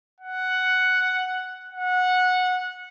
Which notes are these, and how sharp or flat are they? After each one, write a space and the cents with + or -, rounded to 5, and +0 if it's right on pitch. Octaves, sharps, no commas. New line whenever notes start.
F#5 +5
F#5 -15